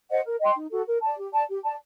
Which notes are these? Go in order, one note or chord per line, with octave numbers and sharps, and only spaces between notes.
C5 D#5 F#5
A#4
D#5 G5 C6
D#4
F#4 A4
A#4
D5 A5
G4
D5 A5
G4
D5 A5